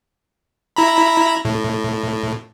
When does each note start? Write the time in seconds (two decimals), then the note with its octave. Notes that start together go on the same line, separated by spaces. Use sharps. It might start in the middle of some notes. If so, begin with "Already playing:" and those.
0.76 E4 A#5 B5
1.45 A2